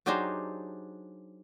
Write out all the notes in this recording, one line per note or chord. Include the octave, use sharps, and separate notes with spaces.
F#3 D4 D#4 G4 G#4 C5